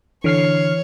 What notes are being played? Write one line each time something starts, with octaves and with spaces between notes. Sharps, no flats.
D3 E3 C#5 F6 C7